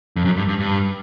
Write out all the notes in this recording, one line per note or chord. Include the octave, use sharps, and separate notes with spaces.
F2
F#2
G2
G2
G2